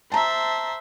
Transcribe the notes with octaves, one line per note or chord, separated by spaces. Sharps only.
C5 E5 A5 A#5